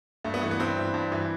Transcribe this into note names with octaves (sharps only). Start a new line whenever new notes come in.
G2 A3
B3
E3 A3
B3
G2 C4
E3
G2
E3